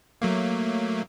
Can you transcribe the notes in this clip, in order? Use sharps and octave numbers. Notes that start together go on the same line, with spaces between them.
F#3 A3 A#3